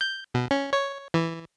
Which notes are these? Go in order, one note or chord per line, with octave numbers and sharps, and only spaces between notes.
G6
B2
C#4
C#5
E3